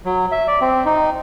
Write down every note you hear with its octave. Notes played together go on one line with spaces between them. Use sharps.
F#3
E5
D5
C4
D#4